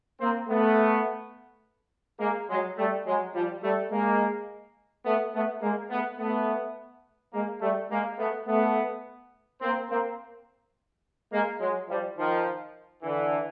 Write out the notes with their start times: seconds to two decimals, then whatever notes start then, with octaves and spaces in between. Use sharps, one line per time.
0.21 A#3 C4
0.49 A3 B3
2.20 G#3 A#3
2.49 F#3 G#3
2.78 G3 A3
3.07 F#3 G#3
3.34 F3 G3
3.63 G3 A3
3.91 G#3 A#3
5.06 A3 B3
5.34 A3 B3
5.62 G#3 A#3
5.90 A3 B3
6.19 A3 B3
7.33 G#3 A#3
7.62 G3 A3
7.91 G#3 A#3
8.19 A3 B3
8.48 A3 B3
9.61 A#3 C4
9.90 A#3 C4
11.33 G#3 A#3
11.61 F#3 G#3
11.89 F3 G3
12.18 D#3 F3
13.03 D3 E3